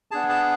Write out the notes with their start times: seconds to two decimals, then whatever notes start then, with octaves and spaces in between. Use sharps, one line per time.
0.11 B3 D4 G#4 A5
0.29 A5